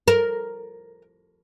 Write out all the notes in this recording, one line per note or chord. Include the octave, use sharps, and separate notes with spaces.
A#4